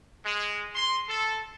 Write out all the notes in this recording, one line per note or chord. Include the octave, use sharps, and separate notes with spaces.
G#3
C6
A4